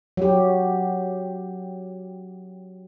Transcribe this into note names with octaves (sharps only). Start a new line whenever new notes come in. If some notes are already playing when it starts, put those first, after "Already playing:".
F#3 G4